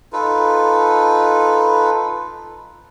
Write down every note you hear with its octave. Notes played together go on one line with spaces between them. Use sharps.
D#4 F4 A4 B4